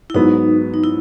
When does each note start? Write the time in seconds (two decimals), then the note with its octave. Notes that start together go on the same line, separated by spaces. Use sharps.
0.10 E4
0.14 G#2 F#3 B3 D#4
0.74 D#4
0.84 E4